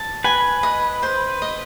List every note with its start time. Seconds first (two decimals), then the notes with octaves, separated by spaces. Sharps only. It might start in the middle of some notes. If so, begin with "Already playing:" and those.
Already playing: A5
0.24 B4 G#5
0.63 D#5
1.03 C5
1.42 D#5